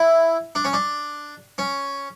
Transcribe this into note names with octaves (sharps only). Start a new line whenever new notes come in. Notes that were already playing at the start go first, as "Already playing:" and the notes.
Already playing: E4
D4
C#4
D4
C#4